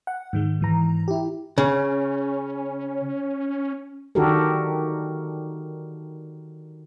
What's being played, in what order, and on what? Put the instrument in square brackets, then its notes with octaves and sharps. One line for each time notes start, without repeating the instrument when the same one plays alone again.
[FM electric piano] F#5
G#2 D#3 G#3
G#2 E3 A#5
E4 G4
[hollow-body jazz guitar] C#3 [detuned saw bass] C#4
[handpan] D#3 D4 F#4 G4 A4 A#4